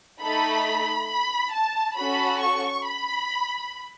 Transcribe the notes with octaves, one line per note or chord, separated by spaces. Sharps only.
A3 D#4 A4 B5
B5
A5
C#4 F#4 A4 B5
C#6
B5